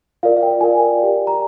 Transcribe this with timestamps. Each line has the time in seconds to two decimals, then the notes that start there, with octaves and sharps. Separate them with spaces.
0.23 F4 A#4 D5 F5
0.37 F5
0.43 G5
0.61 F4 A#4 D5 G#5
0.99 G4 D5
1.27 A#5